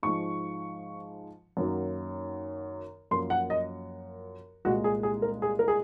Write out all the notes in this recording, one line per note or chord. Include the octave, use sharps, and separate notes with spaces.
G#2 F3 G#3 C#6
F#2 D#3 F#3 A#3
F#2 F3 A#3 C6
F#5
D#5
C2 A#2 G#3 F#4
G#4
G#4
A#4
G#4
A#4
G#4